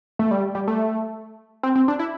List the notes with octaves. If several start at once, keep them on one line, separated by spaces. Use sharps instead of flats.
A3
G3
G3
A3
C4
C4
D4
E4